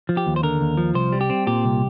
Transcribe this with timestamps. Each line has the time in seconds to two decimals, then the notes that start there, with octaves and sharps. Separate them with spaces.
0.09 F3
0.17 G4
0.26 D#2
0.36 C5
0.43 D3 A#4
0.61 D#2
0.77 F3
0.95 C2 C5
1.12 G3
1.21 G4
1.30 C4
1.47 A#2 G4
1.64 C2